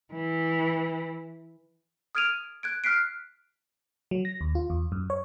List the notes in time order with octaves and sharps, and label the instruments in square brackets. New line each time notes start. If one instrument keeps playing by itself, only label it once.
[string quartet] E3
[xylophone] D#6 F6 G#6 D7 D#7 F7
F#6 G#6 D7
F6 F#6 B6 C7 D7
[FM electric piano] F#3
A#6
D#2
F4
E2
F#2
C#5